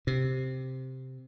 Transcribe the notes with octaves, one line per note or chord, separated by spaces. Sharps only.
C3